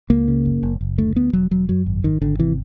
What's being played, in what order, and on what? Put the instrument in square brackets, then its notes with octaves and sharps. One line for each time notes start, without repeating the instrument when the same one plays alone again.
[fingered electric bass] C#2 A#3
C#3
F#1
F#1
F#1
D2 A3
D2 B3
E1 F#3
E1 F#3
F#2 F#3
G#1
G#1 D#3
G#1 D3
C3 E3